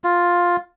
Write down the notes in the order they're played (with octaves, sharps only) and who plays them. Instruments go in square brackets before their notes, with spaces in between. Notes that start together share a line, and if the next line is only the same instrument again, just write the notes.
[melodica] F4